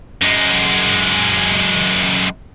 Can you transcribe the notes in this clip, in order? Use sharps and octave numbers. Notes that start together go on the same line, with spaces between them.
F#2 G#3